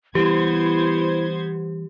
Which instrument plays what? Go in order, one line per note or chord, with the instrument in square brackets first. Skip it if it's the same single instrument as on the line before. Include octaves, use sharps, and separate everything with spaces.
[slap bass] E3 G3 [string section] B3 C5 G#6 [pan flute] E4 [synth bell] G4